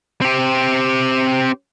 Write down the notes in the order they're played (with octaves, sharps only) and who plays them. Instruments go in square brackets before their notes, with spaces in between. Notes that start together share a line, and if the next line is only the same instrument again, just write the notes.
[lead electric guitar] C4 G4